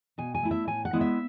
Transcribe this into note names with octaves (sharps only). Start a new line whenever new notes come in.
B2 G#5
G#5
A3 E4
E5
A2 G#5
F#5
G#3 B3 E4
E5